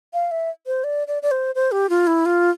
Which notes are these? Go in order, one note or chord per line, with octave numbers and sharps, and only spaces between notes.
F5
E5
C5
D5
D5
D5
C5
C5
G4
F4
E4
F4